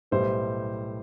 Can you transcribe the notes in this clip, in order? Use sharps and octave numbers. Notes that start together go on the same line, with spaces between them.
B1 A2 G3 B3 C5